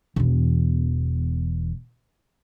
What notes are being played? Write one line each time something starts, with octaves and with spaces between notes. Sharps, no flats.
E1 E2